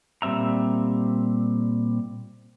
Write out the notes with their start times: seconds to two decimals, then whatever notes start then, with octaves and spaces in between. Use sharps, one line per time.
0.22 A#2 G3 C4 E5 A#5